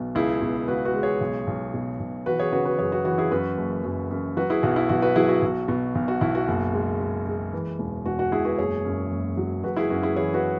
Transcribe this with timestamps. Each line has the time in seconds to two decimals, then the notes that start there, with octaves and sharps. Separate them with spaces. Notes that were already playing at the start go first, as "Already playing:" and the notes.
Already playing: B1 B2
0.15 C#2 E4 G#4
0.42 B2
0.68 C#2 F#4 B4
0.85 F#4 B4
0.94 G#3
1.03 G#4 C#5
1.21 B1
1.47 B1
1.74 B2
2.00 B1
2.26 E3 F#4 B4
2.39 G#4 C#5
2.52 C#3 F#4 B4
2.65 F#4 B4
2.79 F#2 G#4 C#5
2.92 F#4
3.05 E3 F#4
3.18 E4 G#4
3.31 F#2 F#4 B4
3.57 F#1
3.84 F#2
4.11 F#2
4.37 F#3 F#4 B4
4.50 E4 G#4
4.63 B1 F#4
4.76 E4
4.89 B1 F#4
5.02 F#4 B4
5.16 F#3 E4 G#4
5.29 F#4
5.42 B1
5.68 B2
5.95 B1
6.08 F#4
6.21 B1 E4
6.35 F#4
6.48 F#1
6.74 G#3
7.00 G#3
7.27 G#3
7.53 E3
7.79 E1
8.06 E1 F#4
8.19 F#4
8.32 E1 E4 G#4
8.45 F#4 B4
8.58 F#1 G#4 C#5
8.85 F#2
9.11 F#1
9.37 F#3
9.64 F#1 F#4 B4
9.76 E4 G#4
9.90 F#2 F#4
10.03 E4 G#4
10.16 E3 G#4 C#5
10.34 F#4 B4